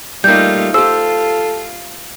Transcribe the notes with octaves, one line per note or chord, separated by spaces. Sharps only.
G3 A3 A#3 D#4 F4 G6
F4 G4 A4 C5 E6